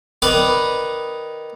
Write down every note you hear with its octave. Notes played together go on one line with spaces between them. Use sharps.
D#3 B4 D5 D#5 B5 D#6